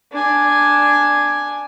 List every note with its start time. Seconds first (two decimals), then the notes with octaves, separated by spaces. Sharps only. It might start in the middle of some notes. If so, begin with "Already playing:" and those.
0.12 D4 G#5